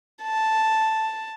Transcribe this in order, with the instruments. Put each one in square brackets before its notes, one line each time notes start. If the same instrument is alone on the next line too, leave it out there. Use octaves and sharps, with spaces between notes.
[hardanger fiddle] A5